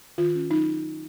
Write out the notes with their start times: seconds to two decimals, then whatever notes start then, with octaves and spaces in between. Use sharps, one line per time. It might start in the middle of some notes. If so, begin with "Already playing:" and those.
0.18 D#3 F4
0.35 C#4
0.51 F#3 D#4